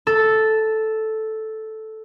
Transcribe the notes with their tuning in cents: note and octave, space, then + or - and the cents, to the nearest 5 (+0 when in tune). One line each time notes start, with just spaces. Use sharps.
A4 -5